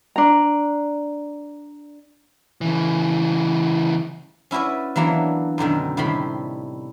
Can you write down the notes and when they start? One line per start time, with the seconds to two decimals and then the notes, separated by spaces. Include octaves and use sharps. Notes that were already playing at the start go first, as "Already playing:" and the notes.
0.16 D4 A#5
2.61 C#3 E3
4.51 C#4 E4 F#4 B4 D5
4.96 E3 F#3 A#3 B3 D4
5.58 F#2 B2 D3 D#3
5.97 A2 C3 D#3 G3 B5 C6